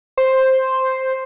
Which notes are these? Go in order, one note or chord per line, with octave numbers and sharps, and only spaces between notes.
C5